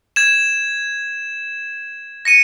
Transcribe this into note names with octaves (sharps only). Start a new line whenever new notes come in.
G#6 E7
A#6 C#7 D#7